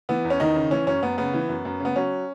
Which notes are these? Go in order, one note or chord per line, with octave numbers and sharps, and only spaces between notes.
E3 B3
E2
C#4
E2 D#3 D#4
C#3
E3 C#4
F#2 C#4
F#2 B3
C#3 B3
E3
F#2
F#2
C#3 B3
F#3 C#4